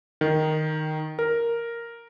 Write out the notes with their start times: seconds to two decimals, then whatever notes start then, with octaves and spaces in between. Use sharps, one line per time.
0.21 D#3
1.19 A#4